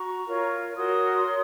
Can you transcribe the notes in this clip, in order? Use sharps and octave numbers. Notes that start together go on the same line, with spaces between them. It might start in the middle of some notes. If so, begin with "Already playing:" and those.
Already playing: F#4 A#5 C#6
F4 A#4 C#5
F#4 A#4 C#5 C6 D#6
A#4 C#5